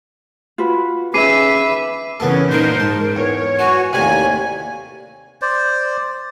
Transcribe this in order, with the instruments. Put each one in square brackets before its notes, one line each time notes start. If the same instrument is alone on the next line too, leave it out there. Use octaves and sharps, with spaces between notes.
[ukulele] F4 F#4 B4
[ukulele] C#4 G#4 [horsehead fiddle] B4 E5 [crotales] D6 C7 D#7
[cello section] C#3 E3 C#4 [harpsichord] B3 A4 [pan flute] A#4
[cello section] A#2 D#4 C5 [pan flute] A#4
[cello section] G#2 [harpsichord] A5
[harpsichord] E2 [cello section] C#5
[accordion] F#4 [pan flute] G#5
[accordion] D#2 G#5 [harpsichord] A2 C3 [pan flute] D5
[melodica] C5 D5